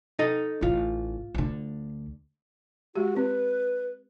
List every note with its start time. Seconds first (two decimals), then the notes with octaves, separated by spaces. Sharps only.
0.19 D#4 A4 D#5
0.62 A1 F4
1.35 D2 D3
2.96 G#3 F#4 G4
3.17 C4 B4